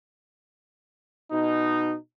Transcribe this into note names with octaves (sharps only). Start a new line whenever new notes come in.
B2 D#4